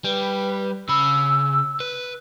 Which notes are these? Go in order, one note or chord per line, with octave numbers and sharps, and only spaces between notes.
G3 B4
C#3 B5 E6
B4